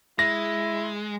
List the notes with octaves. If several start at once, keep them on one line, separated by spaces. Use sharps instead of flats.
G#3 E4 A#6